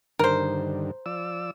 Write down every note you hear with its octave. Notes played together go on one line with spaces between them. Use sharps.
G2 D3 D#3 A#4 C5
F3 D5 E6